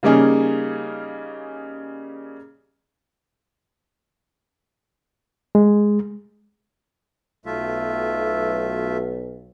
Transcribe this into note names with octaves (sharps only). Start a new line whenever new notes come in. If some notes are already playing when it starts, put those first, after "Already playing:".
C#3 G3 A#3 C#4 D#4 G#4
G#3
B1 A3 F4 E5